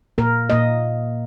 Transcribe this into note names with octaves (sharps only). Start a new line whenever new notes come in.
A#2 A#3 A#4
A#2 A#3 D#5